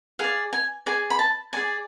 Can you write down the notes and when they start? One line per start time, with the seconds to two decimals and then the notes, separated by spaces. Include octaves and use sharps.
0.19 G#4 D5 F5
0.53 G#5
0.86 G#4 D5 G#5
1.10 B5
1.19 A5
1.53 G#4 D5 G#5